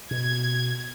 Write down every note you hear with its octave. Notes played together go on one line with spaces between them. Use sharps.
B2 G#6